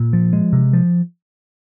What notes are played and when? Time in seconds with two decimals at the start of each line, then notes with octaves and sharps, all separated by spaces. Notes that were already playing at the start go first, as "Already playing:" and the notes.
Already playing: A#2
0.13 F3
0.33 G#3
0.53 C3
0.73 F3